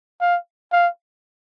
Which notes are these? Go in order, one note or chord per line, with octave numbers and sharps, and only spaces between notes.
F5
F5